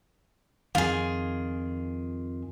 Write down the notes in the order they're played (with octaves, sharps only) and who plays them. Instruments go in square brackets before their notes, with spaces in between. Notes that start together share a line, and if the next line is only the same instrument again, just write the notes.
[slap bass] F2 D#3 [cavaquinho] F4 G#4